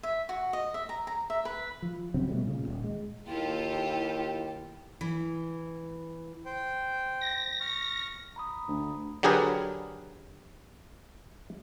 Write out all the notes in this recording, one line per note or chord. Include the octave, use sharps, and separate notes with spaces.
E5
F#4
D#5
E5
A#5
A#5
E5
B4
F3
D1 C#3 F#3 C4
B2 D#3 G3 A3
A#2 C#3
D#1 C#2 A#2
G#3
D#2 E4 F4 G4 A4 G5
E3
C5 G5
A#6
C#6 F6
A#5 B5 D#6
D2
D3 F#3 G4 G#4 A#4 B4